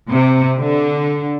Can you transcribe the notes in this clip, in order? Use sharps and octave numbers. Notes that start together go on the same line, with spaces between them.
C3
D3